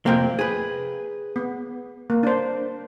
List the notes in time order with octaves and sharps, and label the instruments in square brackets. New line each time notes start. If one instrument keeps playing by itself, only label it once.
[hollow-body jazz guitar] F2 C3 A#3 [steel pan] C5 G5
[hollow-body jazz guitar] G#4 B4
[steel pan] B3
A#3
D4 C5